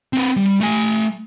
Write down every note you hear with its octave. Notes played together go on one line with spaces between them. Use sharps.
C4 B4
G3
A3 G#5